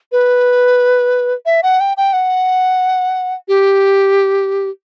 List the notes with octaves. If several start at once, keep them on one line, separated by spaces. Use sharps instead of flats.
B4
E5
F#5
G5
G5
F#5
G4